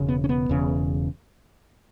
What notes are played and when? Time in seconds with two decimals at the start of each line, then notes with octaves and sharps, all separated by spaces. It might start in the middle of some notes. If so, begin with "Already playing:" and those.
Already playing: E1 C#3
0.08 B3
0.24 C#4
0.29 B3
0.49 E1 E2 C#3